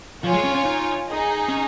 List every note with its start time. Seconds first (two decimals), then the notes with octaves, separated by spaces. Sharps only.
0.24 F3 F4 C#5 G#5
0.34 G#3
0.44 C#4
0.55 C#4
0.65 D#4
1.07 D#4 G#4 D#5
1.49 C#4